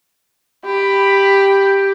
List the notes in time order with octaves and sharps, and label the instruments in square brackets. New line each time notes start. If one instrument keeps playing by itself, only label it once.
[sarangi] G4 [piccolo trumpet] B5